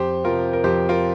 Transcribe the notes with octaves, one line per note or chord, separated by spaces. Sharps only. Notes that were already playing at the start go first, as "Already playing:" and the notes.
Already playing: F2 G4 C5
C3 F3 F4 A#4
A#4
F2 G4 C5
F4 A#4